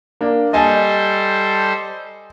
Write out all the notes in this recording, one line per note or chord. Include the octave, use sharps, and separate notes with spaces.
A#3 D4
G3 A4 C5 D#5 G#5 A5